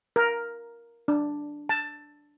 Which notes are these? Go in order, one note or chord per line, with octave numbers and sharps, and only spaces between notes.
A#4
D4
A5